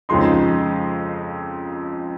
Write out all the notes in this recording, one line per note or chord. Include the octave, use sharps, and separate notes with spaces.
F2 C#3 F3 G#3 D#4 C6